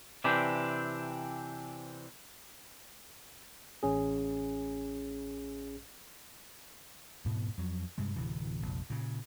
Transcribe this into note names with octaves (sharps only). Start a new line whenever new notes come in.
C3 E3 C4 D4 G4
A1 C#4 G#4
E1 G#2 B2 B3
F2 F#3
G2 C3 G#3
D1 C3 E3
F1 A#1
A#2 C#3